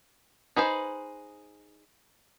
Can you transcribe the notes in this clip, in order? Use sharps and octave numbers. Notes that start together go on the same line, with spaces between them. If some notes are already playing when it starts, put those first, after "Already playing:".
D#4 G#4 B4 C5